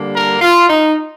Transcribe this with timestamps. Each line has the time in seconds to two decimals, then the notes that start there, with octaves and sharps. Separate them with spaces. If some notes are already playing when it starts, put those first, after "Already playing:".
Already playing: D3 G3 A#3 D4
0.12 A#4
0.41 F4
0.69 D#4